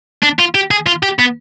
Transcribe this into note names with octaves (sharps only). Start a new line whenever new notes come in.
D4
F4
G4
G#4
F4
G4
B3